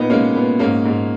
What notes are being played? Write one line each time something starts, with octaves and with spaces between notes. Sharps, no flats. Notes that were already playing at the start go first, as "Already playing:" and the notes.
Already playing: A#2 B3 D#4
G#3 A#3 C#4
A#2 B3
G#2 A#3 C#4
G#2